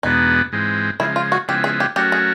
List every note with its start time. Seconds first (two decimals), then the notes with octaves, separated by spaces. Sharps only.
0.03 E2 B2 G#3 B3 D4 D#4
0.52 G#2 E3 G#3 C4
1.00 C#3 F3 G#3 E4
1.16 F4
1.32 F#4
1.48 C#3 F3 G#3 B3 E4 G4
1.64 G#4
1.80 G4
1.96 F#3 A3 C#4 F#4 G4 A#4
2.12 G#4